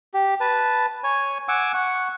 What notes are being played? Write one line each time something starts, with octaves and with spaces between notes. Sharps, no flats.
G4
B4 A5
C#5 G#5
F#5 G#5 D6 E6
F#5 C#6